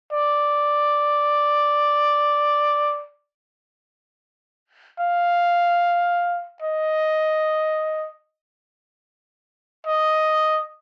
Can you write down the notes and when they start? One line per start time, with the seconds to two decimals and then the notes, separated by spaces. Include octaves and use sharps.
0.13 D5
5.00 F5
6.62 D#5
9.87 D#5